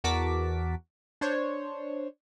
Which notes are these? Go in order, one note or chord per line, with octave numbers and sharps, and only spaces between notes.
E2 F#4 A#4 A5 D6 B6
D4 C5 C#5